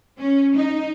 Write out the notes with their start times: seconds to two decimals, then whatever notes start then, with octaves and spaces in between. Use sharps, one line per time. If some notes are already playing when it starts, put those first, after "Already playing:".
0.19 C#4
0.56 D#4